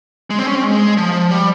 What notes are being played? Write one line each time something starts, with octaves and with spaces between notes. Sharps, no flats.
G#3
C4
C#4
C4
G#3
F3
G3